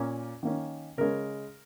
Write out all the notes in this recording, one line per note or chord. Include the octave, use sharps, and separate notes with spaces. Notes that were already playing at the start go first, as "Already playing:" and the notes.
Already playing: A#2 A#3 C#4
D#3 A#3 C#4
C#3 G#3 C#4 A#4